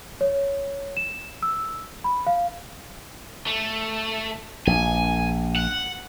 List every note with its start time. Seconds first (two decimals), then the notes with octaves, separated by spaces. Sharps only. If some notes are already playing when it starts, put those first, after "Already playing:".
0.21 C#5
0.97 E7
1.42 E6
2.04 B5
2.27 F5
3.47 A3
4.67 A#1 G#5
5.56 F#5